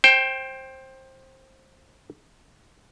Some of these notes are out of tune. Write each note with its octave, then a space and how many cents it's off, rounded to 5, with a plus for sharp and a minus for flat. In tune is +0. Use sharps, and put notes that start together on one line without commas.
C5 +20 G5 +0